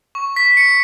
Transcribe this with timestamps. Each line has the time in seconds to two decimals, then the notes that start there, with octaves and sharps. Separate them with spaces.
0.15 C#6
0.36 B6
0.57 C#7